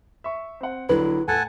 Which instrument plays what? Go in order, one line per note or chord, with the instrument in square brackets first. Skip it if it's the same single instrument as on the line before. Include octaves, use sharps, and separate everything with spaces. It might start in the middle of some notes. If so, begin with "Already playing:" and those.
[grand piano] E5 C#6
C4 F#5
[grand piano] A#1 D3 F#3 [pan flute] E4 [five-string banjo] B4
[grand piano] A2 [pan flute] A4 [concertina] F#5 G#5 A5